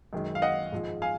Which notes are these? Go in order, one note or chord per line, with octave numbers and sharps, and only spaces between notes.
F#2 D#3 G#3
F5
D#5 F#5
G#2 F3 G#3
F5 G#5